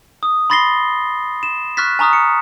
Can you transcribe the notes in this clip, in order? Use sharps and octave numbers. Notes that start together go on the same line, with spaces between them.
D#6
B5 C6 A6 A#6 C7 G7
E7
C#6 F6 F#6 A6 B6
G#5 A#5 C#6 D#6 F6
C#7